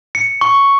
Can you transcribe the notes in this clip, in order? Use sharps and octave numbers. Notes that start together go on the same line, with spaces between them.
C#7
C#6